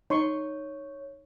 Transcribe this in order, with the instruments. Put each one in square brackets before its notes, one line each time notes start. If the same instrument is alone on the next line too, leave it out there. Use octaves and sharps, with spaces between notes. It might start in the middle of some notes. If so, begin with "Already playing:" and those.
[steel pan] D#4 C6 C#6 [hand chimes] C#5